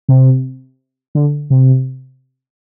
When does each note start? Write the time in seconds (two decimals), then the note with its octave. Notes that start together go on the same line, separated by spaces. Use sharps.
0.09 C3
1.15 D3
1.50 C3